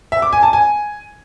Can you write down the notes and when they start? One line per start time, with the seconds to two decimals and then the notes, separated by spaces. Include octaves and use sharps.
0.12 E5
0.22 D6
0.33 G#5
0.43 A5
0.53 G#5